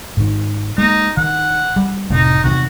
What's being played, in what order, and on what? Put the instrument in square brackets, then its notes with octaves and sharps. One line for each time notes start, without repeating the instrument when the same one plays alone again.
[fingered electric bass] G#2 D#3
[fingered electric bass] G#3 A#3 [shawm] D#4
[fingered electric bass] D#3 [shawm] F#5
[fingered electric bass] G3
[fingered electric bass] F1 A2 C3 [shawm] D#4
[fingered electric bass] E2 C3 D#3 [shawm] F#4